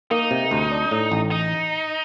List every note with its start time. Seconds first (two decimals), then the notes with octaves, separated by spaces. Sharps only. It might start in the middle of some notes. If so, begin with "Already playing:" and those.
0.11 A#3 D#4
0.31 C3
0.51 D2
0.72 D4
0.91 A2
1.12 A1
1.31 D#4